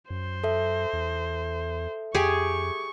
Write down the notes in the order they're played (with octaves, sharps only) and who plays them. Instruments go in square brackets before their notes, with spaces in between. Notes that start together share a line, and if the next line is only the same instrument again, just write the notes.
[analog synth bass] F#2 [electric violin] C5
[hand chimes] A4 E5
[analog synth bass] E2
[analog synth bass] F2 [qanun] G4 G#4 G#5 [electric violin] C#6